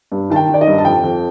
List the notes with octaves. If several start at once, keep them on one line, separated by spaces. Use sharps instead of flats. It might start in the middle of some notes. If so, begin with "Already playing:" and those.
G2
D#3 A5
G5
D#3 D5
D#5
G2
A5
F2 G5
F2